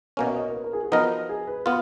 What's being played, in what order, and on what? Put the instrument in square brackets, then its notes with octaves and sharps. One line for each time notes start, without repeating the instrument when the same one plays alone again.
[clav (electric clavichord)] B2 A#3 C#4 [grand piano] A#4
[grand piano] C#5
D#5
A#4
B4
A#4
G#4
F#4
[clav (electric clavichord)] F3 B3 D#4 A#4 D#5
[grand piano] G#4
B4
[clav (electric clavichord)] B3 F4 [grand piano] F5